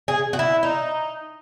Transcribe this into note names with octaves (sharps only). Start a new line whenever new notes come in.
G#4
F#4
E4
D#4